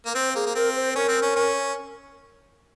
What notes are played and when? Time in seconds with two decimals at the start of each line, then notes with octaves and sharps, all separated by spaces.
0.06 A#3 A#4
0.15 C4 C5
0.35 A#3 G#4
0.46 A#3
0.55 C4 A#4
0.76 C5
0.95 C#4 A#4
1.08 C4
1.22 C#4
1.36 C#4